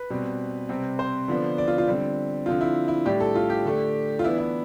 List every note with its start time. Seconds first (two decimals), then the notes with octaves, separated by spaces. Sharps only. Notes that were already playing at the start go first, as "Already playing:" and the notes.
Already playing: B4
0.10 B2 G3 C4
0.69 C3 G3 C4
0.99 C5
1.28 D3 F3 B3 D4
1.58 D5
1.68 F4
1.78 F4
1.88 D3 G3 C4
2.46 D3 F3 C4 F4
2.61 E4
2.88 E4
3.06 A2 G3 D4 G4
3.20 A4
3.35 F4
3.50 G4
3.65 D3 A3 D4
4.19 F4
4.24 E3 B3 D4 E4
4.38 E4